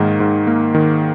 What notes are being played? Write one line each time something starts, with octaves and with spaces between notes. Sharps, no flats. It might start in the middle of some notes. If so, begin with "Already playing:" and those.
Already playing: G#2 D#3 A#3
G#2
A#3
D#3